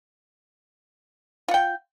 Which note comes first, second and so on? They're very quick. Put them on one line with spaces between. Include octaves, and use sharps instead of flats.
F4 F#5 G5